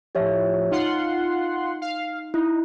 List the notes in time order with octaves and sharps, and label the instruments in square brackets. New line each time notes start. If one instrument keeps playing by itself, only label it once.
[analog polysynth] A2 F3 [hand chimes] G4 C#5 E5
[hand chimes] D#4 [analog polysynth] F4 F#5 C6
[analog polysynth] F5
[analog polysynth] D#4 [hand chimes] E4